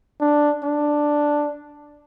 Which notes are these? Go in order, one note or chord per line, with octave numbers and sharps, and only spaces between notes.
D4
D4